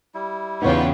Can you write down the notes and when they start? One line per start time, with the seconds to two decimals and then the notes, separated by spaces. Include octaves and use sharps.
0.15 G3 E4
0.62 E2 C#3 B3 C#4 D#4 F4 C#5 G5